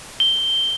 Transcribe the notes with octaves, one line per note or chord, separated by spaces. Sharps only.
G7